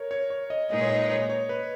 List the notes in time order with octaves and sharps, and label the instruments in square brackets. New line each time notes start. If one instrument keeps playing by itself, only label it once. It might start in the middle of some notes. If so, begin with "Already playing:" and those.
Already playing: [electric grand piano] A#4 C#5
C#5
C#5
D#5
[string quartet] A#2 G#3 D#4 G#4 B4 [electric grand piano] D#5
[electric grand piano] C#5
D#5
C#5
C#5
B4